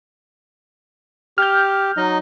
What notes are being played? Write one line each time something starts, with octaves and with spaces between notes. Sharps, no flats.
G4 F6 G6
F#3 D#4 D#5